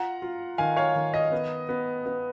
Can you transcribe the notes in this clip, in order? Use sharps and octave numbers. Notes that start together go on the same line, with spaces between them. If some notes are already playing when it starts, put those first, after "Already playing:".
Already playing: F4 F#5 A#5
F4
D#3 F5 G#5
C#5 F5
D#3
D#5
B3
B3
B3